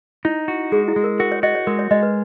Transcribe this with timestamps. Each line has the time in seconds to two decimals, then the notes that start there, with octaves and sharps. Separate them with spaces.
0.25 D#4 E4
0.48 F#4
0.72 G#3 G#4
0.88 E4
0.96 G#3
1.04 A#4
1.19 F#4 A#4
1.32 C#5
1.43 F#4 D#5
1.55 C#5
1.67 G#3 A#4
1.79 C#5
1.91 G#3 D#5
2.03 B4